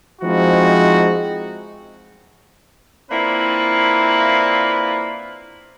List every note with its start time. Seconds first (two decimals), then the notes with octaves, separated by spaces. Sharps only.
0.22 F3 G#3 C4 D#4 E4 F#4
3.11 A#3 C4 D4 E4 F4 B4